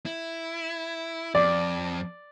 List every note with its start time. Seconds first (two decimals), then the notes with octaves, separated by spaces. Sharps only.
0.06 E4
1.35 F2 D5